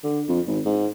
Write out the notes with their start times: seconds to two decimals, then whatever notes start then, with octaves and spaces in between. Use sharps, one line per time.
0.03 D3
0.28 F2
0.47 G#1
0.65 G#2